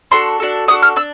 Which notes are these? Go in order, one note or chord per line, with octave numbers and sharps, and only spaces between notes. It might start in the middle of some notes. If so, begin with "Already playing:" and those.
D4 F#4 A4 C6
D4 F#4 A4
D4 F#4 A4 D#6
F6
D4 E6